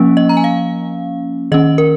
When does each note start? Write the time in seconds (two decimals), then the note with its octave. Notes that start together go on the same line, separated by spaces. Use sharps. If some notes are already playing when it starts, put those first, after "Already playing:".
Already playing: F3 A#3 C#4
0.17 D#5
0.29 A#5
0.37 G#5
0.44 F5
1.52 D#3 C#4 D#5
1.78 A#4